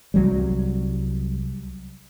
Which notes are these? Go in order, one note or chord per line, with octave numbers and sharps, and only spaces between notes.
C2 F#3 G3